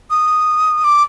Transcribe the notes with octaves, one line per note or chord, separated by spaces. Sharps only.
D#6
D6